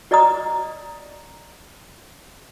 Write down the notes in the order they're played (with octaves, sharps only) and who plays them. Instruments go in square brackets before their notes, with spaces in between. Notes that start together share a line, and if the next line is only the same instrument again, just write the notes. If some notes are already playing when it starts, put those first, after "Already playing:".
[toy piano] F#4 D5 D#5 A#5 D#6